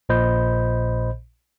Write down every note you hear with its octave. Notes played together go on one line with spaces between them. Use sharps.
A#1 A#2 C5 D#5 B5 G6